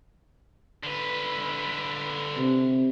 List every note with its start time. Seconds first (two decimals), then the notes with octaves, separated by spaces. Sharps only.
0.83 D3 B4
2.37 C3